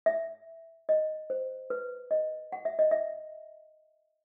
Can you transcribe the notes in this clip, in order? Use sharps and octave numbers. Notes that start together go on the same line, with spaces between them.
E5
D#5
C5
B4
D#5
F#5
E5
D#5
E5